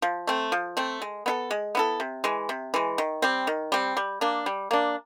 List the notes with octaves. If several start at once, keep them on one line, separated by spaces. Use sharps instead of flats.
F3
A3 C4
F3
A3 C4
G#3
B3 E4 A4
G#3
B3 E4 A4
C3
E3 G#3
C3
E3 G#3
D#3
G3 C4
D#3
G3 C4
G3
A#3 D4
G3
A#3 D4